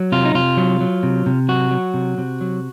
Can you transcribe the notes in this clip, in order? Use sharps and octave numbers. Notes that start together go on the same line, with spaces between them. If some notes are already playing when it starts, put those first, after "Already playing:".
Already playing: F#3
C3 F4
D#4
C3 F4
F#3
F#3
C3
C3
F#3 F#4
F#3
C3
C3
F#3